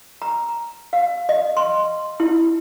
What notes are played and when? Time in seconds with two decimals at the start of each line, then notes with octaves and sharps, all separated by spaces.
0.22 A#5
0.93 F5
1.29 D#5
1.57 C6
2.20 E4